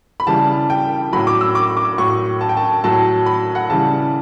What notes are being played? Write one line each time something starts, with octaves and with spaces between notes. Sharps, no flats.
B5
C#3 E3 G3 A5
G5
A2 F#3 B5
D6
E6
D6
D6
A2 F#3 C#6
A5
G5
A5
A2 F#3 A5
B5
F#5
C#3 E3 G3 A5